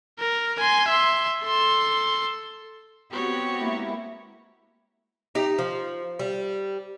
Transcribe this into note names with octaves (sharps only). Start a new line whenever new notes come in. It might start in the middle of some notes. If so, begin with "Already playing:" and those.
A#4
G#5 C6
E5 C6
A4 C6
B3 C4 F#4 G4 C#5
G#3 A#3 E4
D#4 G4
F3
G3